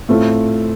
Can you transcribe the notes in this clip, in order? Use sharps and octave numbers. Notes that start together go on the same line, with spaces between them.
A2 A3 C4 F4